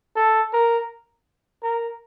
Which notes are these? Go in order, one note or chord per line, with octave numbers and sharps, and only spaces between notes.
A4
A#4
A#4